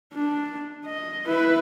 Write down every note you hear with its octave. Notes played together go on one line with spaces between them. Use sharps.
D4
D#5
E4 B4